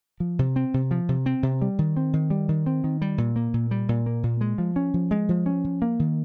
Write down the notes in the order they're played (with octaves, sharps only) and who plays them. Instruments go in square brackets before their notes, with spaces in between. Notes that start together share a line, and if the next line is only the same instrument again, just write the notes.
[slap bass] F3
C3
C4
C3
F3
C3
C4
C3
G3
D#3
C4
D#3
G3
D#3
C4
D#3
G3
A#2
A#3
A#2
G3
A#2
A#3
A#2
G#3
F3
C#4
F3
G#3
F3
C#4
F3
A#3
D#3